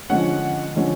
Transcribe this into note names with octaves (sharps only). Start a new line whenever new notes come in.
D3 F3 G#3 C#4 F#5
D3 F3 G#3 C#4